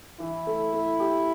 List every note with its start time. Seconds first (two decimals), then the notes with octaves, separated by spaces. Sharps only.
0.20 E3 E4
0.47 A3
0.73 A3
1.00 G4